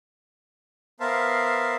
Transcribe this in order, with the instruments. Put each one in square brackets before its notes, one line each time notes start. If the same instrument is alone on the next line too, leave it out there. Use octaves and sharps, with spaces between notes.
[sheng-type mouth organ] B3 A#4 C5 E5 F5 A5